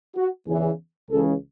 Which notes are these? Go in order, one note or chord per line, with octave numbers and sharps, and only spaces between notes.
F#4
E2 C#3 E3 G#4
C#2 C#3 E3 A4